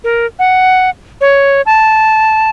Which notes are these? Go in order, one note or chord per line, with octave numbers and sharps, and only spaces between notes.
A#4
F#5
C#5
A5